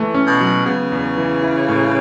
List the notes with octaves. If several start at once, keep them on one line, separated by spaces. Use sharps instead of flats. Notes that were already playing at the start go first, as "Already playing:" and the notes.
Already playing: E3 A3
C#4
B2
F#3
C#3 B3
E2
E3
E4
A2